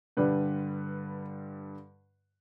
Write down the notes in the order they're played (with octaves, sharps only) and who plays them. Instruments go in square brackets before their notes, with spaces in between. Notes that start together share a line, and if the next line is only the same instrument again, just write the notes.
[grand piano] G2 D3 G3 B4